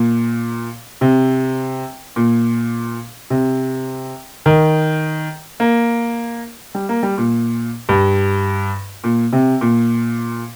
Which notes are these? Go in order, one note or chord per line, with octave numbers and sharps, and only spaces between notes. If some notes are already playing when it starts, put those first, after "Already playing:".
Already playing: A#2
C3
A#2
C3
D#3
A#3
G3
A#3
G3
A#2
G2
A#2
C3
A#2